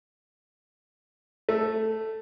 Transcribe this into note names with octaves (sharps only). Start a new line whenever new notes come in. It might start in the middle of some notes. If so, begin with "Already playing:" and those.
A3